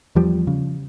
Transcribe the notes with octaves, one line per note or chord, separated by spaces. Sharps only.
E2 F3 G3
C#3